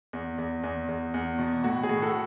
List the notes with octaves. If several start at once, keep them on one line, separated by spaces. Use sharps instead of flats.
E2
E2
E2
E2
E2
B2
A2 F#4
G#4
A2
F#4 A4